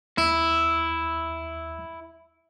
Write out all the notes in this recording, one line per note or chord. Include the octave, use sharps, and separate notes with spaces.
D#2 E4